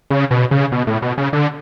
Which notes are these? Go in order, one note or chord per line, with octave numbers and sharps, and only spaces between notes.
C#3
B2
C#3
B2
A2
B2
C#3
D3